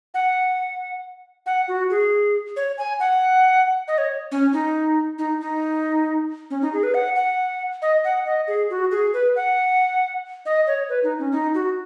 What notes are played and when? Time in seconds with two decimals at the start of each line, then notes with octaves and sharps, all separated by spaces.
0.14 F#5
1.46 F#5
1.68 F#4
1.90 G#4
2.56 C#5
2.78 G#5
3.00 F#5
3.88 D#5
3.98 C#5
4.32 C#4
4.53 D#4
5.18 D#4
5.40 D#4
6.50 C#4
6.62 D#4
6.73 G#4
6.83 B4
6.94 F#5
7.16 F#5
7.82 D#5
8.04 F#5
8.26 D#5
8.48 G#4
8.70 F#4
8.91 G#4
9.13 B4
9.36 F#5
10.46 D#5
10.67 C#5
10.89 B4
11.04 D#4
11.19 C#4
11.32 D#4
11.55 F#4